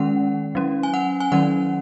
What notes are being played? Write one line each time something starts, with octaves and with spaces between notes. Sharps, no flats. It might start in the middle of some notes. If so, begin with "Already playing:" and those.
Already playing: D#3 G#3 C#4 F#5
F#3 C#4
G#5
F#5
G#5
D#3 F#3 C#4 F#5